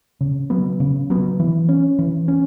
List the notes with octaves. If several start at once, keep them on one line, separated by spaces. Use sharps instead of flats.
C#3
F#3 B3
C#3
F#3 B3
E3
C#4
E3
C#4